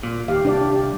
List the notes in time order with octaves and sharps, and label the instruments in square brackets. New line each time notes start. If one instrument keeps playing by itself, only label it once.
[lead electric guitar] A#2
[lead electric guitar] D#2 [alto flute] G4 [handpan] F5
[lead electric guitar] C2 [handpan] D4 D5